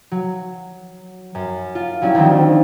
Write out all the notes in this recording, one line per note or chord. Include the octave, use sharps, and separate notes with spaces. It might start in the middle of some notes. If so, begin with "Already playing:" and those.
F#3
F#2
F4
F#3 G3 C#4 E4
D2 D#3 F3 F#3 C4